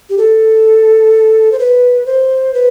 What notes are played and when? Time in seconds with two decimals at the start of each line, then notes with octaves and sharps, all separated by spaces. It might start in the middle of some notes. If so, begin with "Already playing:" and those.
0.10 G4
0.18 A4
1.52 C5
1.60 B4
2.06 C5
2.54 B4